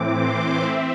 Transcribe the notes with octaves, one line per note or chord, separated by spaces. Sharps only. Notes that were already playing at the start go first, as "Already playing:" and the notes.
Already playing: A2 E3 C4 D6
C6
C4 E5